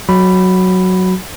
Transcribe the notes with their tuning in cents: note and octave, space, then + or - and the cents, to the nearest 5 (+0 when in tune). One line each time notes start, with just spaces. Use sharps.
F#3 +0 F#4 +0 B5 +0